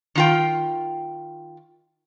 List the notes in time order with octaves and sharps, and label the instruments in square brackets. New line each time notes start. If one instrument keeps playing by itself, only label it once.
[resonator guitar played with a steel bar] D#3 F4 G5